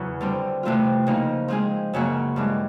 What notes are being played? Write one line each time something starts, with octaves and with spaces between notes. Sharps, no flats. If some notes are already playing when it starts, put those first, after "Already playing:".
Already playing: E2 C#3 F#3 B3
D3 G3 C4
C3 E3 A3 C4 F4
C#3 F3 A#3 D#4
F3 G#3 C4 F4 G#4
F#2 C#3 F#3 A#3
G2 E3 G#3